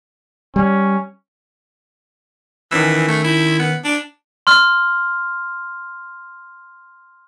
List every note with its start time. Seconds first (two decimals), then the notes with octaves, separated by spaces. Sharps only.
0.56 G3 C#4
2.72 D#3 E3 C#4 E6
3.08 A3
3.24 E4
3.59 B3
3.85 D4
4.47 C6 F6